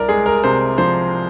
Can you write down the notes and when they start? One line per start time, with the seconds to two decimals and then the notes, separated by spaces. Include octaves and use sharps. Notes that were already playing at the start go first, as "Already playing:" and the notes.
Already playing: C2 A#4 D5
0.09 G#3 G#4
0.26 A#4
0.44 C3 C5
0.78 F3 C5